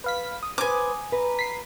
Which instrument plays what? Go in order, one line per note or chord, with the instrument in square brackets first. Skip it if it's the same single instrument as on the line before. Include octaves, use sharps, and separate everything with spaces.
[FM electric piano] B4 F5 B6
D#6
[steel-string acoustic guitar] B4 C5 [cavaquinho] G#5 D6
[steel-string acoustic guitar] B4 A#5
[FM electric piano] B6 C7